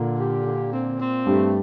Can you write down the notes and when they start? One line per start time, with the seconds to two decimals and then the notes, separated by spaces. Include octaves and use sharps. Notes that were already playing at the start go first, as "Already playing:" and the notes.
Already playing: A#2 D3 A#3
0.17 G4
0.44 D3
0.71 C4
0.99 C4
1.26 G2 G3 A3